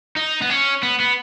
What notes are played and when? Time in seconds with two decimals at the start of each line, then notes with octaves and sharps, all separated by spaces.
0.16 D#4
0.42 B3
0.50 C#4
0.83 B3
1.00 B3